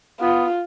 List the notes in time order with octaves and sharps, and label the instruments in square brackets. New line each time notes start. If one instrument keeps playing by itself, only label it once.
[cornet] B3 [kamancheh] F4